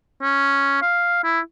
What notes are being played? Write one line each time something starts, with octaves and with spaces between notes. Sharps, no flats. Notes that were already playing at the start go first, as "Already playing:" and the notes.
C#4
F5
E4